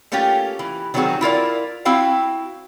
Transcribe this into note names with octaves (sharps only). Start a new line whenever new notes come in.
A3 A#3 C#4 F4 G4
E3
D#3 F#3 G3 C4 F#4 G#4
E4 F4 A#4 D5
C4 E4 F#4 F5 G5